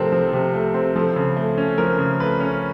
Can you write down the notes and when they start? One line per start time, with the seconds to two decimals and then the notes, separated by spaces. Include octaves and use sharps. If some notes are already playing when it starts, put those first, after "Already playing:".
Already playing: C3 F3 A3 C4 A4 A#4
0.12 F3
0.33 C3
0.54 A3
0.74 C4
0.96 F3 A4
1.16 C#3
1.37 A3
1.58 C#4
1.78 F3 A#4
1.99 C#3
2.20 A3 B4
2.40 C#4